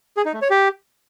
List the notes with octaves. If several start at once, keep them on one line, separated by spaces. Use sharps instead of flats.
G#4
D#4
A3
C#5
G4